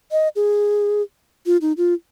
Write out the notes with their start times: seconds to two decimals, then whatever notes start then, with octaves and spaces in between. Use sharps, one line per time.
0.12 D#5
0.36 G#4
1.46 F4
1.61 D#4
1.77 F4